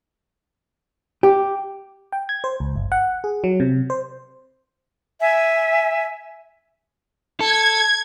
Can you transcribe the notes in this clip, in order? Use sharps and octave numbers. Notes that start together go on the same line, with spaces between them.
G4
G5
G#6
C5
C#2
G1
F#5
G#4
F#3
C3
C5
E5 G#5
A4 G#6